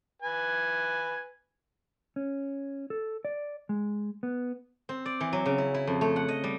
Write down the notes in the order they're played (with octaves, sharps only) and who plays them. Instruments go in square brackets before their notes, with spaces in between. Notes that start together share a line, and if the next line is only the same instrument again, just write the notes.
[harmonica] B4 G#5
[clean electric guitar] C#4
A4
D5
G#3
B3
[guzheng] C4
D5
E3
F#3
C#3
E4
E4
F2
A3
F#5
D#5
G3